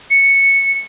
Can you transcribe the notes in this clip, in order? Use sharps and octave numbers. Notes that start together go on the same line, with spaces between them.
C#7